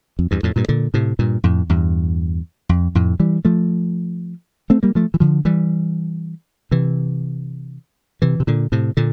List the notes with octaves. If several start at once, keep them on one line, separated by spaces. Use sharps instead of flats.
F2
E2 G2
F2 A2
G2 A#2
A#2 D3
A2 C3
G2 A#2
F2 A2
E2 G2
F2
F2 A2
E3 G3
F3 A3
A3 C4
G3 A#3
F3 A3
E3
D3 F3
E3 G3
C3 E3
C3 E3
C3
A#2 D3
A2 C3
A#2 D3